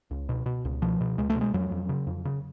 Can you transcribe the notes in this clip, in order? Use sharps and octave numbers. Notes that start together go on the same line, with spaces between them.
C#2
B2
B2
C#2
B2 F3
B2
C#2 G#3
A3
B2
G#3
F2 F#3
F2
C#3
F2
C#3